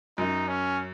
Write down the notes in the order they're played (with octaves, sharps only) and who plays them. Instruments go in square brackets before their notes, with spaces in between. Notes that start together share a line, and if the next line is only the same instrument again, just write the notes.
[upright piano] F#2 [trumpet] D#4
[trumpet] C#4